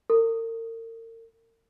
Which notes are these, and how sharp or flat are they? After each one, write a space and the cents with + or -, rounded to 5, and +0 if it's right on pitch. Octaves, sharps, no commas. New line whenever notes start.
A#4 -40